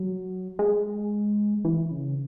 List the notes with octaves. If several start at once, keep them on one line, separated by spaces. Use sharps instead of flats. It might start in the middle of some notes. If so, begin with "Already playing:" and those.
Already playing: F#3
G#3
E3
C#3